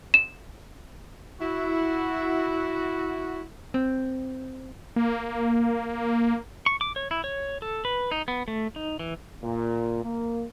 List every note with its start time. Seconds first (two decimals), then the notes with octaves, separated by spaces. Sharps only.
0.14 E7
1.40 E4 F#4
3.74 C4
4.96 A#3
6.66 C#6
6.81 D6
6.96 C#5
7.11 E4
7.24 C#5
7.62 A4
7.85 B4
8.11 D#4
8.28 B3
8.48 A3
8.76 D#4
8.99 E3
9.43 A#2
10.04 A#3